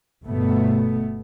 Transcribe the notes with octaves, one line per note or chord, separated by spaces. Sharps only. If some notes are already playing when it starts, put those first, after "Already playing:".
G1 B2 A3 B3